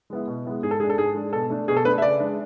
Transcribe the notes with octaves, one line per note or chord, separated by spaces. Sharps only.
G#3 B3 E4
B2
G#3 B3 E4
G#2 G#4
A4
G#3 D4 G#4
A4
G#2 G#4
G#3 D4
B2 A4
A3 D4
B2 G#4
A4
A3 D4 B4
E5
C#3 D5
G#3 D4